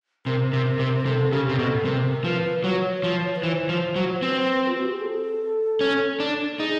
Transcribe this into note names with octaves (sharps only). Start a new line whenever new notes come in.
C3 A#4
C3
C3
C3 A4
C#3 G4
C3
B2 A4
C3 A#4
F3 B4
F#3 C#5
F3
B4
E3 C5
F3
F#3
C4 B4
F4
F#4
G4
G#4
A4
C#4
D4
D#4 G#4